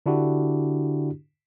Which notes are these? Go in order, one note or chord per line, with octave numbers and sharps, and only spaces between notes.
D3 D4 E4 F#4 G4